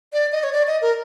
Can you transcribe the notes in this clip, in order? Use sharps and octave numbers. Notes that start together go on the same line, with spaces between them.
D5
D#5
C#5
D5
D#5
A#4